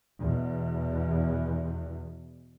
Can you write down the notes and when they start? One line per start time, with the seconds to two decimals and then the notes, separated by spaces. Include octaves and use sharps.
0.19 E2 B2